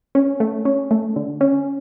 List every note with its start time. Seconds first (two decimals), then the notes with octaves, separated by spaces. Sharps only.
0.15 C#4
0.40 A3
0.65 C#4
0.91 A3
1.16 D3
1.41 C#4